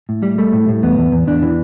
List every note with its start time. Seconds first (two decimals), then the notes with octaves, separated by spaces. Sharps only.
0.09 A2
0.23 G3
0.38 G3 A3
0.53 A2
0.69 A2
0.83 E2 B3
0.98 E2
1.12 E2
1.27 E2 D4
1.43 E3